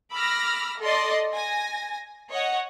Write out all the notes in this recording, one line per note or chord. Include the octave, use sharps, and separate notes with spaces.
B5 D6 E6 F6 A#6
A4 D5 D#5 C6
G#5 A#6
C#5 D#5 F#5